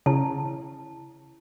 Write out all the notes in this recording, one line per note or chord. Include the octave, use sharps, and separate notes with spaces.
C#3 E4 A5